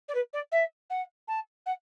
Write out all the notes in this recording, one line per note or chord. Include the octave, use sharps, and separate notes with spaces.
D5
B4
D5
E5
F#5
A5
F#5